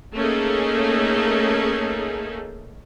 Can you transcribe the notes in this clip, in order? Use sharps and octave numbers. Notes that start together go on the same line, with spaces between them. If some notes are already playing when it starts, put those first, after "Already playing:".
A3 A#3 C#4 D#4 G#4 A4